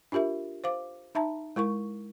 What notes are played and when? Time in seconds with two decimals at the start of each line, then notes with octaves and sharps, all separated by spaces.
0.12 D4 F4 G4 A#4 E5
0.64 C5 F5 D6
1.15 D#4 E5 A5 A#5
1.56 G#3 E4 A#4 C#6